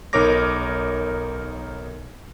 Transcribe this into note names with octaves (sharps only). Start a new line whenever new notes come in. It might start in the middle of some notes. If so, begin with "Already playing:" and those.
B1 D#4 A#4 C#5 D6 A#6